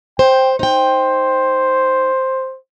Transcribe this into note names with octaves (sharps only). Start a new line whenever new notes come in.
C5 G5
D#4 C5 G5